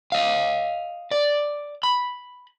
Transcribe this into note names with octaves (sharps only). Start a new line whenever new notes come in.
D#5 F5
D5
B5